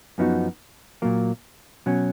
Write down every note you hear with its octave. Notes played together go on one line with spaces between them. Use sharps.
F#2 F3 B3 D#4 F#4
A#2 F#3 A#3
B2 F#3 C#4